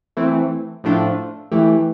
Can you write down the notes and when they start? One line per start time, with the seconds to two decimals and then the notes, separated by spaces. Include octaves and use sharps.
0.17 E3 A3 C4
0.84 A2 F3 A3 D4 F4
1.52 E3 A3 E4 G4